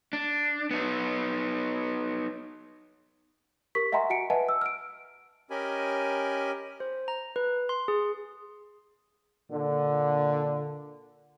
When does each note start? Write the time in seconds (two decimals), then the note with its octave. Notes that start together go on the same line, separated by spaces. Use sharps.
0.13 D4
0.71 B3 D#4
3.75 G4 A#4 C#6 B6
3.92 D#5 E5 F#5 G#5 A#5 C6
4.10 F#4 F#5 G#5 C#7 D7
4.30 B4 D#5 E5 F#5 G#5 A5
4.49 E6
4.61 F6 D7
5.50 C#4 G4 A#4 D#5 G#5 B5
6.80 C5
7.08 A#5
7.36 B4
7.69 C6
7.88 G#4
9.50 A#2 D3